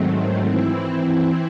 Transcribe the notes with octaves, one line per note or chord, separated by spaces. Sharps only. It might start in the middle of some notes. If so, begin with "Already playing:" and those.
Already playing: G#2 D#3 F#3 A3 C4
E3 C4 E4